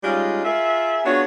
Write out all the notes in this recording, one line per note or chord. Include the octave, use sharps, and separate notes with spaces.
G3 G#3 C#4 D#4 F4
F4 G#4 A#4 E5
B3 D4 F4 F#4 G#4 C#5